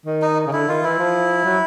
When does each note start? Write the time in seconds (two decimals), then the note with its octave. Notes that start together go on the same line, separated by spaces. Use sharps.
0.06 D#3
0.22 D#4
0.47 C#3
0.52 D3 E4
0.68 D#3 F4
0.83 E3 E4
0.98 F3
1.45 F#3